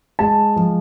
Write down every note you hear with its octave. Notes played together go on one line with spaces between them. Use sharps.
G#3 A5
F3